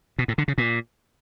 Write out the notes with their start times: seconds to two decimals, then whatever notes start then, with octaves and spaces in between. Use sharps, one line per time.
0.19 B2
0.28 A2
0.38 D3
0.48 C#3
0.58 A#2